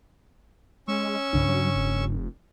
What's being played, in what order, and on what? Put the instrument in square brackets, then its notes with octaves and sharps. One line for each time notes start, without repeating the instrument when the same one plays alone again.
[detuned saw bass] G#3 [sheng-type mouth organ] C#4 C#6 E6
[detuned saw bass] C2 [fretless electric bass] G2 C#3 D4
[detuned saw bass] F#3
F1